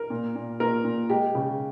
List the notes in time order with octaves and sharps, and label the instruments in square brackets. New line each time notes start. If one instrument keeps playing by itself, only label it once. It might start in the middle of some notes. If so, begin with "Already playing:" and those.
Already playing: [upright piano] A#4
A#2
A#2
A#2 A#4
A#2
G#3 G4
C#3